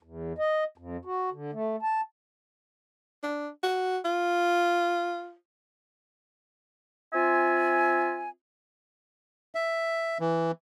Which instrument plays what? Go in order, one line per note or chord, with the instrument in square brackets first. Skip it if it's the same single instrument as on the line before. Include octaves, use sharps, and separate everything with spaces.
[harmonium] E2
D#5
F2
F#4
D3
A3
A5
[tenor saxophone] D4
F#4
F4
[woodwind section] C4 F4 E5 G#5
[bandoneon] E5
E3